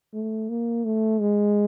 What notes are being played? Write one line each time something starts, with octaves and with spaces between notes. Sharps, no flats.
A3
A#3
A3
G#3